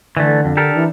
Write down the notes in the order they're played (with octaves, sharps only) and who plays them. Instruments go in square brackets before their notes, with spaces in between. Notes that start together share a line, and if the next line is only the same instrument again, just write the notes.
[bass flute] D3 [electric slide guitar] E3 A3 [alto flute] D5
[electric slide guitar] F2 [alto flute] D4
[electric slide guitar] G4 A4 A#4
[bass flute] E3